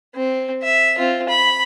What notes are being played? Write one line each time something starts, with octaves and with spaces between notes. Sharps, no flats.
C4
E5
C4 F4
B5